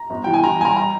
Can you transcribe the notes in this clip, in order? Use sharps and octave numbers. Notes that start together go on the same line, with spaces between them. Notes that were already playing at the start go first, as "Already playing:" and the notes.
Already playing: A#5
G1
E3 G5
G#5
E3 A#5
G2 G#5 A#5
A#5